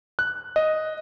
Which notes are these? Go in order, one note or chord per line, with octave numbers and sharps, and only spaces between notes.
F#6
D#5